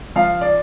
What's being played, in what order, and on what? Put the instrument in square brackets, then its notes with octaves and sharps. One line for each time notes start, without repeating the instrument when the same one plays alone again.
[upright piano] F3 F5
D5